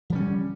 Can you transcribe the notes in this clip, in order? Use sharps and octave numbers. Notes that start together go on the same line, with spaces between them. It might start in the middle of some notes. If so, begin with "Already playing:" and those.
D3 F3 G3 C#4